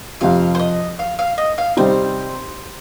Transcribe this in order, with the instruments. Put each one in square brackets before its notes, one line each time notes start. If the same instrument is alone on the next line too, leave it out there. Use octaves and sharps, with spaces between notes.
[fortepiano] F2 C3 F3 [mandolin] F5
[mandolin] C5
D#5
F5
F5
D#5
F5
[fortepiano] C3 G3 C4 D#4 [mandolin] C5